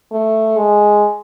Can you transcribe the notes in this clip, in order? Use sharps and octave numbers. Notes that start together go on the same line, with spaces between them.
A3
G#3